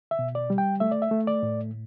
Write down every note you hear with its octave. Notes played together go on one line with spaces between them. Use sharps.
E5
B2
D5
G3
G5
A3 E5
D5
E5
A3
D5
A2